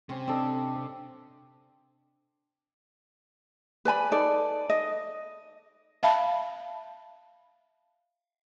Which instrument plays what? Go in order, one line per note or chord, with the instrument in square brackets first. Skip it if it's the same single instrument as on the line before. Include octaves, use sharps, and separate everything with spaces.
[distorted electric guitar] C3 [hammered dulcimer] C4 C#4 C6
[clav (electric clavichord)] C4 A4 D#5 [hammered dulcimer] D4 D5
[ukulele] B4 D5 G#5 B5
D#4 A4 D5
D#5
[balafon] E5 F5 A5 B5